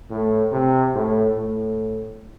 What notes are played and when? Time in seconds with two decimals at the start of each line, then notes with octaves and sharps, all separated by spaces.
0.10 A2
0.52 C3
0.95 A2
1.37 A2